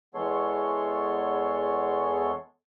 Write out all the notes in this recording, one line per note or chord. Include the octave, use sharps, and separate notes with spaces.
E2 G#3 B3 A4 C#5 C6